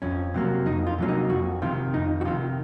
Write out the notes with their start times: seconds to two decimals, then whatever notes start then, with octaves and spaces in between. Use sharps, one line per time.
0.02 F2 C#4
0.34 C3 F#3 A#3
0.66 F2 D#4
0.87 F4
0.98 C3 F#3 A#3 C#4
1.08 D#4
1.30 F2 F#4
1.62 C3 D#3 F4
1.94 F2 D#4
2.21 F#4
2.25 C3 D#3 F4